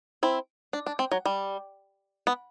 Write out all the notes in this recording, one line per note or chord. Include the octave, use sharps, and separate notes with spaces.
C4 E4
D4
D4
C4
F#3
G3
B3